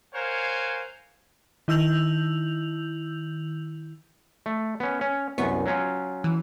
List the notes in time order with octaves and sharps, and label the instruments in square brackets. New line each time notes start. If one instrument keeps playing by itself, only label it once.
[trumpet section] A#4 C5 C#5 F5 F#5 G#5
[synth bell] D#3 E4 E6 G6 F7 F#7
[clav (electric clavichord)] A3
B3 C#4
C#4
[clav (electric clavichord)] C2 F#2 [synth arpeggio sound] B3 C#6
[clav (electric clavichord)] F#3 C#4 F4
[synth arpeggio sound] E3